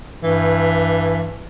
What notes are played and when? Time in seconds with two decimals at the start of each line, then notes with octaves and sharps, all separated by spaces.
0.23 G2 E3